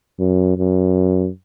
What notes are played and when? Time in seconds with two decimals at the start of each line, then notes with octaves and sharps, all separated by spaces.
0.19 F#2
0.58 F#2